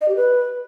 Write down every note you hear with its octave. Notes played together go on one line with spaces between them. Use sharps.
D#5
G4
B4